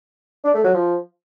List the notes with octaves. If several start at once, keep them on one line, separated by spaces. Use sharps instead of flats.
D4
A3
F#3
F3